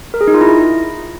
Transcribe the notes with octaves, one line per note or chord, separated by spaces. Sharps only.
A#4
G#4
D#4
F4
E4